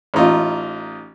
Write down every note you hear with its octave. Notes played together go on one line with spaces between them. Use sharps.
A1 D#4 F4